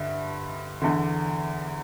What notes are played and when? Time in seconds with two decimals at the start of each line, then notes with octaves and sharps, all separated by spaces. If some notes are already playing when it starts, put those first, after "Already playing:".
Already playing: G2 D3 E5
0.82 E2 D3